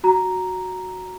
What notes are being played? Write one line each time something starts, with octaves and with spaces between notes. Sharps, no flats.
F#4 A#5